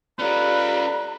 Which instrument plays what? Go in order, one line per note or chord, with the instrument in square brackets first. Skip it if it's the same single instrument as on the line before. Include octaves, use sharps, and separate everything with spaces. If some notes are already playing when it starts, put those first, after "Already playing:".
[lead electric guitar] C#4 F4 [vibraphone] G4 A4 D5 [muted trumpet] B4 [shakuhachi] A#5